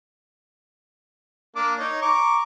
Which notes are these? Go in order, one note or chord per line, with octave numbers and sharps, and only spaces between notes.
A#3 D4 D6
D#4 C#5
A#5 C#6 D6